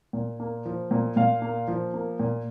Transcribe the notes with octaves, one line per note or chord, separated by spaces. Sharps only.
A#2
A#3
F3
A#2
A#2 F5
A#3
F3
A#3
A#2